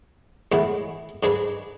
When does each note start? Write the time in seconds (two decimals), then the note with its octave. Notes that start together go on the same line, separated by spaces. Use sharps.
0.52 A2 E3 G#3 B3 E4
1.23 G#2 G#3 D4 G#4 B4